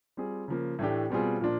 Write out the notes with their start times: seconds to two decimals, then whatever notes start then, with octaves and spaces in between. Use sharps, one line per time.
0.17 G3 C4 F4 G#4
0.48 C#3 F3 A#3
0.79 A2 E3 A3 D4 G4
1.10 B2 G3 C4 F4 G#4
1.41 A#2 F3 A#3 D4 F4